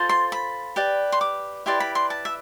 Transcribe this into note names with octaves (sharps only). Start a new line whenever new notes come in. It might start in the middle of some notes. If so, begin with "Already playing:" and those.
Already playing: F4 A4 C5
C6
B5
G4 B4 D5
C6
D6
E4 G4 B4 D5 C6
B5
C6
A5
E5